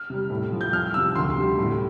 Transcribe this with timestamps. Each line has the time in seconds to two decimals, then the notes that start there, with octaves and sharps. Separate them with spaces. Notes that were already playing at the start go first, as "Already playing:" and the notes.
Already playing: F6
0.10 C3 G3
0.30 A2
0.52 F3
0.61 G6
0.73 F2 F6
0.94 C3 F3 E6
1.16 D2 C6
1.37 C3 G3
1.58 A2